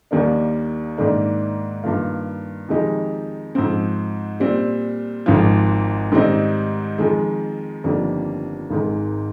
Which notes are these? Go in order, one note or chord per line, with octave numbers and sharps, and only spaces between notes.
D#2 D#3 G3 A#3 D4
G#2 D#3 A#3 D4
G2 D#3 A#3 F4
F2 D#3 G#3 D#4 G4
G#2 F3 C4
A#2 G3 C4
G#1 G#2 F3
G#2 D#3 G3 C4 D#4
F2 D#3 G#3
G1 F2 D#3 G3 A#3
G#1 G#2 D#3 G#3